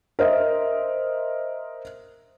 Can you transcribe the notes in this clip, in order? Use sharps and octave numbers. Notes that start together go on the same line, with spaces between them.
A#4 C5 D#5 E5